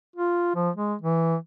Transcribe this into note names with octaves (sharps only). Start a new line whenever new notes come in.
F4
F3
G#3
E3